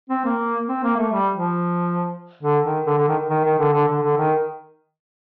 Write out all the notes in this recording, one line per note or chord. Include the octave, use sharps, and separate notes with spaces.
C4
A#3
C4
A#3
A3
G3
F3
D3
D#3
D3
D3
D#3
D#3
D#3
D3
D3
D3
D3
D#3